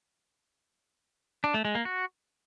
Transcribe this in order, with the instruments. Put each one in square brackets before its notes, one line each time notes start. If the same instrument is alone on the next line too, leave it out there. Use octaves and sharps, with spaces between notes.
[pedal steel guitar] D4
A3
G#3
A#3
F#4